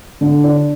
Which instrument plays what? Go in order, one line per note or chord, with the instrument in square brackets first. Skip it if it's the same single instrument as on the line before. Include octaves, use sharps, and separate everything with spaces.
[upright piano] D3
D4